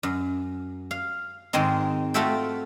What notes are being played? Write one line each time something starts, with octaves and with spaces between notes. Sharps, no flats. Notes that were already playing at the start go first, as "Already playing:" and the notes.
F#2
F5
G#2 D#3 G#3 C4 D#4
A3 F4 F#4 A4 E5 G5